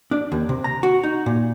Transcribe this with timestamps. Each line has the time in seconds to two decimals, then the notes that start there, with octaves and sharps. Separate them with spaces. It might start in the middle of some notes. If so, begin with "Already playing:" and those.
0.11 D4
0.32 D#2
0.49 C3
0.64 A#5
0.83 F#4
1.03 D#4
1.26 A#2